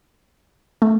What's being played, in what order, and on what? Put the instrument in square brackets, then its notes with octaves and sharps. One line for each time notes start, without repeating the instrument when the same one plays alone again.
[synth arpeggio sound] A3